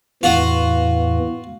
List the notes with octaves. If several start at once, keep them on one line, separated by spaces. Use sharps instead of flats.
E2 A2 E3 F4 F#4